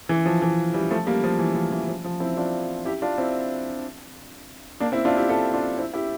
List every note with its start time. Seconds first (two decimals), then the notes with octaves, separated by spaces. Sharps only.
0.09 E3
0.26 F3
0.42 E3
0.74 E3 G3
0.91 F3 A3
1.07 G3 A#3
1.24 F3
1.39 E3
1.55 F3
1.72 E3
1.88 F3
2.04 F3
2.20 C4 E4
2.37 D4 F4
2.85 E4 G4
3.02 D4 F4
3.18 C4 E4
4.80 A#3 D4
4.92 C4 E4
5.05 D4 F4
5.17 E4 G4
5.29 F4 A4
5.53 D4 F4
5.78 C4 E4
5.94 E4 G4